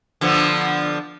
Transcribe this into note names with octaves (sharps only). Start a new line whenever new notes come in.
D3 F3 B3